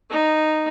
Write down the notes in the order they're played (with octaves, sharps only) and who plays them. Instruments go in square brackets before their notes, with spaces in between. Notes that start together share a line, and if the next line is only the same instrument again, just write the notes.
[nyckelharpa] D#4